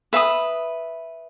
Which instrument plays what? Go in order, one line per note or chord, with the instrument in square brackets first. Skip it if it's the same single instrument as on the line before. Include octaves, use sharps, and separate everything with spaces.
[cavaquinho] B4 E5 B5 D#6